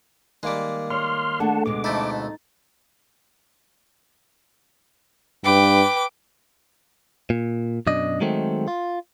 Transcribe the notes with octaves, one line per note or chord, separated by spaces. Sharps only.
D#3 G3 G#3 A#3 D6
C#5 C6 F6
A3 D4 G#4 F#5 A5
D2 B2 G#3 D6
F2 A3 D#4 E4 A6
G2 B4 G5 D6
A#2
F#2 B2 D4 D#5
D#3 F#3 G#3 A3 C4
F4